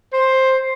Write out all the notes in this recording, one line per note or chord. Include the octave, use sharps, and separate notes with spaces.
C5